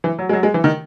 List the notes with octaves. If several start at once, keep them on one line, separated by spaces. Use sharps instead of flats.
E3
F#3
G#3
F#3
G#3
E3
D#3